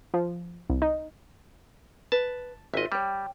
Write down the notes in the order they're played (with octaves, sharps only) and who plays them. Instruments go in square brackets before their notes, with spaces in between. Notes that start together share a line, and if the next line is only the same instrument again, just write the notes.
[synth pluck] F3
C2
D#4
[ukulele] B4 [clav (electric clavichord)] A5
[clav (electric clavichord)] G#1 D#5 [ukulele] F4 E5
[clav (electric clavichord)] G3 [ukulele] C#5 G5